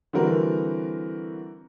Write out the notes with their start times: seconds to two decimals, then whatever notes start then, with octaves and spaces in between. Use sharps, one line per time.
0.13 D3 E3 G3 C4 F#4 A#4